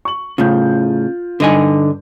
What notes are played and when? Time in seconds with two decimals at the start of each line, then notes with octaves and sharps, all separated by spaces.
0.05 C#6 F#7
0.38 A2 C#3 F4 G6
1.40 G2 D3 D#4 D#5 G#5